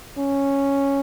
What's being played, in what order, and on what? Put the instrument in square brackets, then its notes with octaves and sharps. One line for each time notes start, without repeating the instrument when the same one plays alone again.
[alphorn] C#4